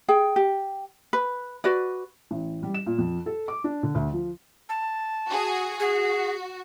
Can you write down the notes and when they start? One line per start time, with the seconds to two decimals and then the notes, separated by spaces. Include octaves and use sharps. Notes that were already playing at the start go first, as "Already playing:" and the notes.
0.08 G#4 G5
0.36 G4
1.13 B4
1.64 F#4 B4 D5
2.31 A1
2.63 G3
2.74 E7
2.86 A#2
2.98 F2
3.26 A4
3.48 D6
3.64 D4
3.83 D3
3.95 D2
4.13 F3
4.69 A5
5.28 F#4 G#4
5.80 F#4 G#4